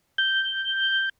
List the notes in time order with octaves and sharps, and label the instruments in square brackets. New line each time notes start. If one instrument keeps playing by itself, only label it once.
[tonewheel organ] G6